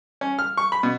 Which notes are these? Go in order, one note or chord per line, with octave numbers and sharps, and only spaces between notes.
C#4
F6
C#6
B5
B2